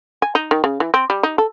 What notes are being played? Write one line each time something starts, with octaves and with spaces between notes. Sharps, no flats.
G#5
D#4
D#3
C#3
E3
C4
G3
D#4
A4